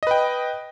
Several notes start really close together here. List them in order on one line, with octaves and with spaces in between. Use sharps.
D#5 B4 G5